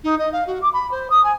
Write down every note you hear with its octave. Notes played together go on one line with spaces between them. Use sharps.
D#4
D#5
F5
F#4
D6
B5
C5
D#6
G#5